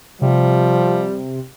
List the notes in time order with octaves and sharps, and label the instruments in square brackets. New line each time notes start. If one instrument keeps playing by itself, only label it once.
[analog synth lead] C3 [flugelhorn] F3 [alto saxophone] G3